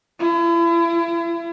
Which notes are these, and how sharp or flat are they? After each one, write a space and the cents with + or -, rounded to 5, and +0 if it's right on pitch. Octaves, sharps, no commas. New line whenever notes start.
E4 +40